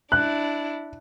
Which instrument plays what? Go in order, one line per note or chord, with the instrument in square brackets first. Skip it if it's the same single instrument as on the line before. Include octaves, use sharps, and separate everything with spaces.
[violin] D4 E4 [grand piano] F#6